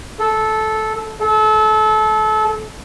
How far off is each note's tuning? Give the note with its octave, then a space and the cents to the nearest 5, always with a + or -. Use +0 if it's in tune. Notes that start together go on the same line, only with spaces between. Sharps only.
A4 -15
A4 -30